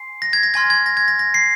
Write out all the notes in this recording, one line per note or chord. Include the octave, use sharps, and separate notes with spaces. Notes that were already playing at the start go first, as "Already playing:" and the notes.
Already playing: G#5 C6 C7
A#6
G#6
A#6
G#5 C6 F6 G#6
G#6
A#6
G#6
A#6
A#6
C7